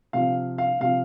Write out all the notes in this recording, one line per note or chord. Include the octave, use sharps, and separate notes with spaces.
C3 F3 F5
F5
C3 F3 F5